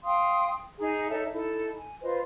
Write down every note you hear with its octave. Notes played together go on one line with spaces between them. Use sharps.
F5 G5 C6 D#6
D#4 G#4 G#5 A#5
D#4 A4 C#5 E5
D#4 E4 A4
G#5
F4 B4 C5 D#5